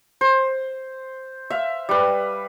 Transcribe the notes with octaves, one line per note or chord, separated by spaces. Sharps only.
C5
E5 F5
G3 B4